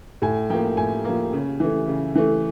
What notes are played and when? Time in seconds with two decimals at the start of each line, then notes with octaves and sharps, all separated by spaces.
0.22 A2 G#5
0.50 F3 A#3 G5
0.77 A2 G#5
1.05 F3 A#3
1.33 C#3
1.60 E3 A3
1.88 C#3
2.15 E3 A3